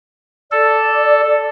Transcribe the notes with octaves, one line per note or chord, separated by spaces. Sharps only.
A4 D5